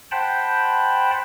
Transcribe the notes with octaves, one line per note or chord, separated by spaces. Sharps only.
C5 F#5 G5 A5 B5